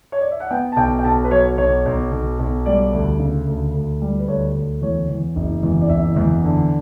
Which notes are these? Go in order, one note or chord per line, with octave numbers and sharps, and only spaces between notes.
C#5
D5
E5
F#5
B3 G5
A5
B1 G5
G5
B1 A5
B4
F#3 C#5
B1 C#5
B1
B1
B1
G3 D5
D2
C#3
D2
D2
G3
B4
D2 C#5
D2
E2 C#5
E2
F#1
E2
D5
F#1 E5
E2
D3